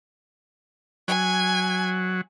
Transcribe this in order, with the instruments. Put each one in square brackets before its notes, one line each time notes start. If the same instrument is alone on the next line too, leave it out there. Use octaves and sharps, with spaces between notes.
[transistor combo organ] F#3 [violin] G#5